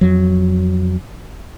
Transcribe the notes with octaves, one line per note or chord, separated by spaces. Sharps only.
F2 F#3